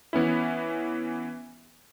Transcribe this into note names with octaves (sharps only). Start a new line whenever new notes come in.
E3 B3 C#4 E4